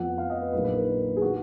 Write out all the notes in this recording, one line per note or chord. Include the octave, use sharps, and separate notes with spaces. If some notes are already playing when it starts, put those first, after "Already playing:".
Already playing: F2 F3 B3 F#5
F5
D#5
B4
A#1 A#2 F#3 A#3 D#4 B4
B4
A#4
A#4
G#4
D#3 F#4